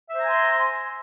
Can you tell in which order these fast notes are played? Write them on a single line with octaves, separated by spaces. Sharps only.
E5 C5 A#5 G#5 C6